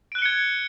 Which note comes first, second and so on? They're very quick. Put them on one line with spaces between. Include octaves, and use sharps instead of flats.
D7 F#6 G7 C#7 G#6